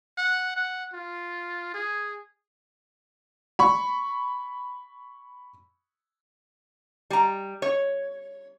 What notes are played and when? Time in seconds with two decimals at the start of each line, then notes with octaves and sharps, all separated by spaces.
0.18 F#5
0.56 F#5
0.93 F4
1.74 G#4
3.59 B5 C#6
7.10 G3 A#5
7.62 C#5